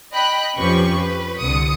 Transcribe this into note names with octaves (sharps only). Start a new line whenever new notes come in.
D#5 G5 B5 F#6
F2 F3 C#4 G4 B4 C#6
B4
C2 D3 D#6 C#7